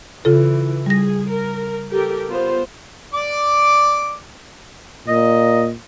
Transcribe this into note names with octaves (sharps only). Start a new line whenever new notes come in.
C#3 E3 F4 A4
G3 G#4 A#6
A#4
G4 A4 A#4
B3 F4 C5
D5 D6
A#2 D#5